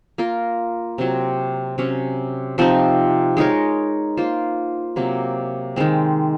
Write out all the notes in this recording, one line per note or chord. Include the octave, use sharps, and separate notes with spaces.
A#3 F4 A#4
C3 F#3 C4
C3 F#3 C#4
C3 F3 C4 D#4
G#3 D#4 A#4 C#5
A#3 F4 C5
C3 F#3 A#3
D#3 G#3 C4